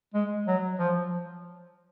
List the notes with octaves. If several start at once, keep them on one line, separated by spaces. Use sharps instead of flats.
G#3
F#3
F3